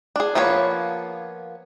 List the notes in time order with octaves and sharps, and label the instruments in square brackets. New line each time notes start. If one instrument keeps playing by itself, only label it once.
[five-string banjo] D4 G#4
F3 A#3 B3 A4 C#5